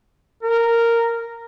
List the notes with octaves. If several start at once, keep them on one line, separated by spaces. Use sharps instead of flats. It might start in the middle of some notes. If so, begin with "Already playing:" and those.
A#4